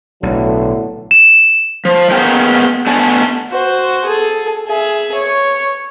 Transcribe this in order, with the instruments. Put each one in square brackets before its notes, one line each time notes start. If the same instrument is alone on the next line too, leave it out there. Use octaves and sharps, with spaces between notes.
[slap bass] B1 [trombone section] A2 F#3 [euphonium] D3
[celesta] E7
[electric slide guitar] F3
A#3 B3 G#4 A#4 G5
A3 B3 D4 D5 G#5 A5
[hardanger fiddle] F#4 C5
G#4 A4
G#4 E5
C#5